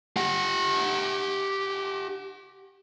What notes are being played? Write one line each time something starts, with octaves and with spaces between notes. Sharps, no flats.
G4 F#5